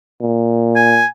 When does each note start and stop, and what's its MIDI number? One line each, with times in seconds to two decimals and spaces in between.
0.21 1.02 46
0.76 1.06 80